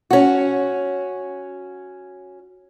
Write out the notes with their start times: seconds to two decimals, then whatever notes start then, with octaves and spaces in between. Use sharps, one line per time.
0.11 C#4 F#4